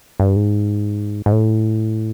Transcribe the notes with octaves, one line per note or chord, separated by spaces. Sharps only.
G2
G#2
G#2
A2